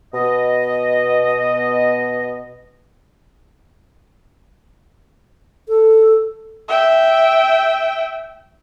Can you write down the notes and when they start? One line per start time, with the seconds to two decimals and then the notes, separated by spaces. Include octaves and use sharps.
0.14 B2 D#5
5.69 A4
6.68 E5 G5